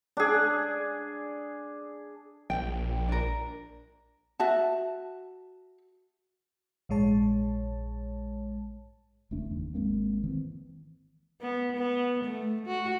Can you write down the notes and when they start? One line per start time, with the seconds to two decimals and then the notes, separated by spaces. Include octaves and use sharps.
0.17 D4 G#4
2.50 A#1 G5
3.09 D4 A#4
4.40 F#4 E5 A5
6.89 A#1 G#2 G#3 C#5 A5
9.31 F#1 E2 A3 D4
9.51 F#1 E2 D#3
9.74 G#1 G#3 A#3 C4
10.24 D#3 E3 C4
11.41 B3
11.76 B3
12.24 A3
12.66 F#4